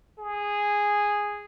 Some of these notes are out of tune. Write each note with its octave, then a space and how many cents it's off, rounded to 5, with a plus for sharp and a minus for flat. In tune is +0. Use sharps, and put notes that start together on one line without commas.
G#4 -10